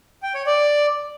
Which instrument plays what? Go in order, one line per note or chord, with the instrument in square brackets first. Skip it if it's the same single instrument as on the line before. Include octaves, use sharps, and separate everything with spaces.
[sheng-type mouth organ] G5
C#5
D5